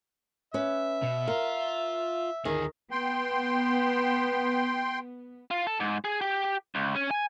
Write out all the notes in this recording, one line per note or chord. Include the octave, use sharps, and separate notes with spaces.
C#4 B4 E5
B2
F4 A#4
D2 D#3 G#4
B3 G5 C6
F4
A4
G#2
G#4
G4
C#2
C#4
G#5